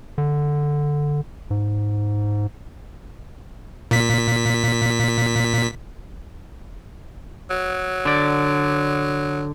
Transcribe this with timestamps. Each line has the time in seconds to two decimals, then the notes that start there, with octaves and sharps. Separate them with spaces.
0.18 D3
1.50 G#2
3.91 A#2 B6
7.50 F#3
8.05 D3 D5